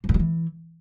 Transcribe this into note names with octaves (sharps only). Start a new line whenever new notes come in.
F3
G2
F#3
E3